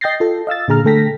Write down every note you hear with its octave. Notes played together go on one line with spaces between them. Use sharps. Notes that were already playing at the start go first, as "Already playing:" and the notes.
D#5 G5 G6 A6 A#6 C7
F4 A4
D#5 F5 E6 A6
A#2 D3 G#4 A#5 F6
D3 A3 A4 G5 A#6 B6